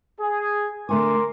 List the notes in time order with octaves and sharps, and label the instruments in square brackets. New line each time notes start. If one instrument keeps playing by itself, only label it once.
[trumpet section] G#4
[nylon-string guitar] D3 A3 G#5 [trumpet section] A#4 C6 D6